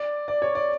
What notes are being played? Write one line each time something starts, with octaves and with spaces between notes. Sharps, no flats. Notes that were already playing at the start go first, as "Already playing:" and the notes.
Already playing: D5
D5
C#5
D5